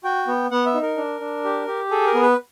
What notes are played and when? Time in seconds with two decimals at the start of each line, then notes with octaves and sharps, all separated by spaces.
0.04 F#4 G5
0.28 B3
0.51 B3 F#5
0.66 E5
0.74 D#4
0.82 A#4
0.97 D4
1.21 D4
1.44 G4
1.67 G4
1.91 G#4 A4
2.07 A#4
2.14 B3
2.23 B4